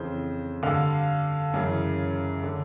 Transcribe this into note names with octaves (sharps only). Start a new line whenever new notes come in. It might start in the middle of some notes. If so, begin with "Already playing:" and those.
Already playing: F2 C#3 E3 C5
G2 D3 F5
F#2 C#3 E3
D3